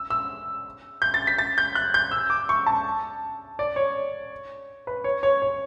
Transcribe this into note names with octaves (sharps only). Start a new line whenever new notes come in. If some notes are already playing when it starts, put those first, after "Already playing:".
Already playing: E6
E6
G6
A6
B6
A6
G6
F#6
G6
E6
D6
C#6
A5
D5
C#5
B4
C#5
C#5
C#5